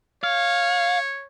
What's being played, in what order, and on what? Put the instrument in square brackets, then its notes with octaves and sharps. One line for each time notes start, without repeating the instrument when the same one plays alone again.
[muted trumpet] C#5 [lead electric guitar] F5